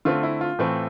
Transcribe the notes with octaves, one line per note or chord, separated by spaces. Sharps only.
D3 A3 C4 F4
E4
F4
A2 E3 A3 C4